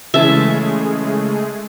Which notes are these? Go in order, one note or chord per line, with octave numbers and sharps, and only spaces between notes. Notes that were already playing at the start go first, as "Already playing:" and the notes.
C#3 E3 G#3 A3 G#4 E5 A5